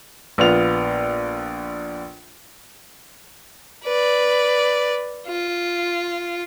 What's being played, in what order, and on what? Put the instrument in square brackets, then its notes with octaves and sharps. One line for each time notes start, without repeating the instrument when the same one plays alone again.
[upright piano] A#1 B3 F4 F7
[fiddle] B4 D5
F4